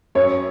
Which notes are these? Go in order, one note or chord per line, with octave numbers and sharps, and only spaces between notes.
F#2 C#5